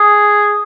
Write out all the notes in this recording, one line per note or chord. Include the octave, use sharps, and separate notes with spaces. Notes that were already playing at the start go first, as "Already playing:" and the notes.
Already playing: G#4